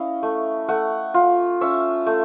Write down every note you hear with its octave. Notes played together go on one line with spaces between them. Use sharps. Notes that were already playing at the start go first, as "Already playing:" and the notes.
Already playing: C#4 E4 D#5 F5
A3
A3 F#5
F4
C#4 E5
A3